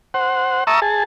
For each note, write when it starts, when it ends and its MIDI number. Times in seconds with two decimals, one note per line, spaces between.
0.14 0.64 72
0.14 0.64 78
0.67 0.80 76
0.67 0.80 81
0.67 0.80 82
0.67 0.80 85
0.67 0.80 87
0.67 0.80 88
0.82 1.04 68
0.82 1.04 81